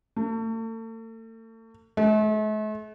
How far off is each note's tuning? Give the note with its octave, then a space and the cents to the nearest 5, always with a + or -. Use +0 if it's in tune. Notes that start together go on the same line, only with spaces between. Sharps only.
A3 +40
A3 -45